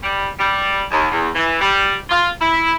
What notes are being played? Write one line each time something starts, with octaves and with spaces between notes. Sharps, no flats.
G3
G3
D#2
E2
E3
G3
F4
E4